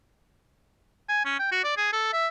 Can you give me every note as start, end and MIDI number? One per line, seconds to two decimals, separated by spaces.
1.09 1.23 80
1.25 1.38 61
1.39 1.49 79
1.52 1.64 66
1.64 1.73 74
1.77 1.88 68
1.93 2.09 69
2.13 2.28 76